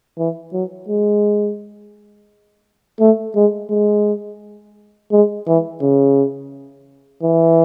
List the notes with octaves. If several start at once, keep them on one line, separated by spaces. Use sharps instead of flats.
E3
F#3
G#3
A3
G#3
G#3
G#3
E3
C#3
E3